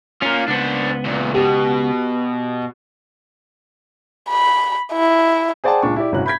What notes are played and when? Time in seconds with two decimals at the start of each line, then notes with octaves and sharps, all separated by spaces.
0.22 A#3 C#4 F4 A#4
0.48 C#2 B3 D4 C5
1.05 E2 A#2
1.34 B2 G4
4.30 B5
4.93 E4
5.64 G#4 C5 D5 F#5 G5 A5
5.82 C#2 A#2 D4 C#6
5.96 E4 G4 D5
6.12 G1 A2 C3 C#4 F#4 F#6
6.26 B5 G6 G#6 B6